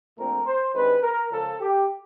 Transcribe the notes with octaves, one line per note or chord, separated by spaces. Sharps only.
A#1 A#2 F3 A3 C4 A#4
C5
G2 D#3 G#3 C4 B4
A#4
C#2 C#3 F3 A4
G4